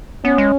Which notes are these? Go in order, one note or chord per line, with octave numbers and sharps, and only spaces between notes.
B3 C#4
G#3